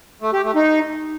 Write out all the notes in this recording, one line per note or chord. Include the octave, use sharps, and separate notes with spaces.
A3
G4
A3
D#4